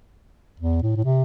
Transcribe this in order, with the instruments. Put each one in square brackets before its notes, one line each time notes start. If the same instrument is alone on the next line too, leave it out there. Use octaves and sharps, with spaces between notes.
[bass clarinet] E2
A2
A2
C3